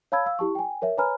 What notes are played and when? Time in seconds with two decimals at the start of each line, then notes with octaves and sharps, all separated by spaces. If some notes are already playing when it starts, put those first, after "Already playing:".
0.12 C#5 F5 A5 B5 E6 G#6
0.26 F5 E6
0.39 E4 G4 A5 C#6
0.55 G5 G#5
0.82 A#4 C#5 E5
0.97 B4 C#5 G#5 A#5 B5 F6